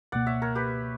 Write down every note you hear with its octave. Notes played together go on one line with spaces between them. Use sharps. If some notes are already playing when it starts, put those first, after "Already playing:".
C#2 B2 A#3 D5 F#5
C#5 E5
A#4 C#5
G4 B4